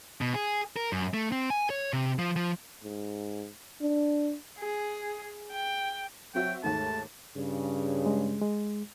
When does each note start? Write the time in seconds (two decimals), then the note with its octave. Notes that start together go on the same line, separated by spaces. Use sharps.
0.21 B2
0.35 G#4
0.76 A#4
0.92 F#2
1.14 A3
1.32 C4
1.50 G#5
1.70 C#5
1.93 C3
2.19 F3
2.36 F3
2.83 G#2
3.81 D4
4.59 G#4
5.52 G5
6.35 F#3 C4 F#4 E5 G5
6.63 D#2 G#2 A3 A5
7.35 G2 C#3
8.06 G#3
8.42 G#3